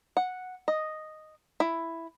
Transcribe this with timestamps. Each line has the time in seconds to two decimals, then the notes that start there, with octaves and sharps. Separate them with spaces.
0.17 F#5
0.68 D#5
1.60 E4